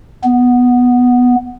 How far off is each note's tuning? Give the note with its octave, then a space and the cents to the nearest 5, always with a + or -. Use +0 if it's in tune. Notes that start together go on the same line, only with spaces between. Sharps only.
B3 +0